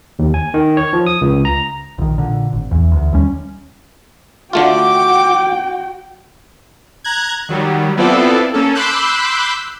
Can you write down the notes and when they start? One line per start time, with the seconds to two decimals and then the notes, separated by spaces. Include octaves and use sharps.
0.19 D#2
0.34 G#5
0.54 D#3
0.77 C#5
0.93 F3
1.07 D#6
1.21 C#2
1.45 A#5
1.98 A#1 D#3
2.18 A#2 D3
2.52 G#1
2.71 E2 E3
2.92 D2
3.12 D#2 G3 C#4
4.53 D3 A3 F4 F#4 G5 D6
7.04 A#5 F#6 G#6
7.49 D#3 F#3 G3
7.97 B3 C4 E4 F4 A4 D5
8.54 A#3 C#4 A4
8.75 B5 C6 D6 E6 F#6 G6